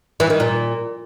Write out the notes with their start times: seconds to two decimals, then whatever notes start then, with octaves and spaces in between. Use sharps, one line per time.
0.20 E3
0.30 D#3
0.40 A#2